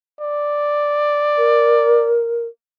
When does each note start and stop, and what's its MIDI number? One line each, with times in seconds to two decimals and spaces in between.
0.21 2.16 74
1.37 2.46 70